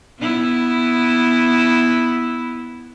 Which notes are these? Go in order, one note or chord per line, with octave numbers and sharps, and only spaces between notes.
B3 E4